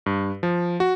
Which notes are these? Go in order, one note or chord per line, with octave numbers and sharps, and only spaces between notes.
G2
F3
F#4